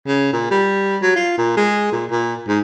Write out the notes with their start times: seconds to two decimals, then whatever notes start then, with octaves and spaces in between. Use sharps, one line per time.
0.07 C#3
0.33 A#2
0.51 G3
1.02 F#3
1.16 F4
1.38 A#2
1.57 G#3
1.92 A#2
2.11 A#2
2.48 G#2